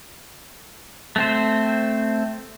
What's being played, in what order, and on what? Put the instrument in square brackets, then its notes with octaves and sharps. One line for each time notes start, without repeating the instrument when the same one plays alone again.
[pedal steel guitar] A3 C4 C5